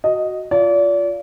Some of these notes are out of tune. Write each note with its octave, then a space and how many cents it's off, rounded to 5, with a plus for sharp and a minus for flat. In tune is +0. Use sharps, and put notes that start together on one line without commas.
F#4 +0 D#5 +0
F4 +0 D5 -35